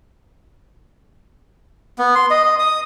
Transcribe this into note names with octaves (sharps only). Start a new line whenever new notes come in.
B3
C6
D#5
D#5
D#6